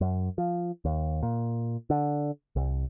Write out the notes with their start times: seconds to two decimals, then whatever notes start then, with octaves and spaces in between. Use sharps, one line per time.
0.01 F#2
0.38 F3
0.85 D#2
1.23 A#2
1.90 D3
2.56 C2